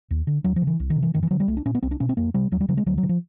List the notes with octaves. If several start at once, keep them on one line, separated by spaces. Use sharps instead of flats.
D#2
D3
D#2 F#3
F3
C#3
E3
C2
D#3
C3
E3
F#2 D#3
E3
D3 F#3
G3
C2 A3
D4
A#2 C#4
B3
C2 C4
D4
B2 C#4
C4
F2 A#3
C3 G3
D#2 F#3
G3
C#3 F#3
G#3
D2 F#3
F#3
D3
F3